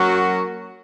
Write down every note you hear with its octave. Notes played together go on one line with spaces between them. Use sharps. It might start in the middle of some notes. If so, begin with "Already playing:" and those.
Already playing: F#3 A#3 C#4 F#4